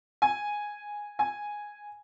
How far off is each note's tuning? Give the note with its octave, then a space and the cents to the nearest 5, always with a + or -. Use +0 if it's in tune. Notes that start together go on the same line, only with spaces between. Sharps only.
G#5 -5
G#5 -5